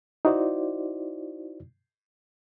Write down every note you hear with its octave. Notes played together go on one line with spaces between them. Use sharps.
D#4 E4 F#4 C5 D5